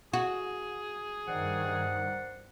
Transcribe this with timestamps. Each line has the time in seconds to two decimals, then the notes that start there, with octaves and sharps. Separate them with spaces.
0.13 F#4 G#4
1.28 G2 D#3 C5 D5 F#5